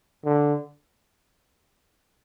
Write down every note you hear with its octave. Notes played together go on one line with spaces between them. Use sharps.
D3